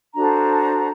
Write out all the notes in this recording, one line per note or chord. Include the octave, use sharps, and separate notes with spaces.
D4 F#4 A4 C5 A#5